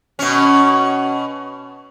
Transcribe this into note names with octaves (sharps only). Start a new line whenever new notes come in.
B2 C#4